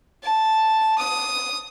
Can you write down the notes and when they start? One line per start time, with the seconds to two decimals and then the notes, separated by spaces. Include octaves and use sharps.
0.23 A5
0.98 D#6